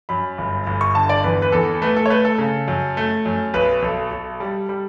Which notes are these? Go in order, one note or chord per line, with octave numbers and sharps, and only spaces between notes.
F#2 B5
G1
G1 B5
C#6
D3 A5
D5
E2 B4
B4
E2 A4
A3 B4
A4
C#5
A3 B4
A4
C#3
F#2
A3
F#2
B1 B4
B1 A4
B1
G3
G3